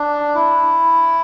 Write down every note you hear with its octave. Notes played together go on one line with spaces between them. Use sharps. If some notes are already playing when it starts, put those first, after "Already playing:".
Already playing: D4
E4